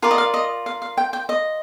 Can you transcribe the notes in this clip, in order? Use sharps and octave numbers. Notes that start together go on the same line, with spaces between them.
F4 A#4 D5 F5
D#5
F5
D#5
F5
F5
G5
G5
D#5